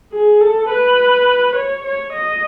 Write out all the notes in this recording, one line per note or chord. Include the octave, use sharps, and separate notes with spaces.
G#4
A4
B4
C#5
C#5
D#5